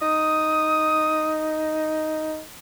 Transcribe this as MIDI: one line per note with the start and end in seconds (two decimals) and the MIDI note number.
0.02 2.41 63
0.02 1.57 87